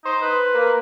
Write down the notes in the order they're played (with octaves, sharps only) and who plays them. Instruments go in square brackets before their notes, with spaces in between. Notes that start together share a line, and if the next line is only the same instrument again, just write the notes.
[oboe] D#4 [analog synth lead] C5
[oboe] B4
[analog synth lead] A#3